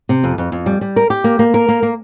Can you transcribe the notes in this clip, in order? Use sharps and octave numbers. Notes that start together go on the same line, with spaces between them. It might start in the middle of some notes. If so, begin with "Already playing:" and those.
C3
F2
F2
F2
G3
G3
A#4
G4
A#3
A#3
A#4
A#3
A#3